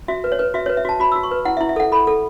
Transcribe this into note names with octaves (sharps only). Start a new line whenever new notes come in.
F#4 E5
B4
C#5
B4
F#4 E5
B4 C#5
E5
F#4 A5
F#4 B5
F#4 E6
C#6
B4
E4 F#5
E5
E4
E5
A4 F#5
A4 B5
A4